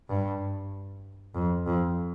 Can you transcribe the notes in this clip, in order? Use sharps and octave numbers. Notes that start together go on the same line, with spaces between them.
G2
F2
F2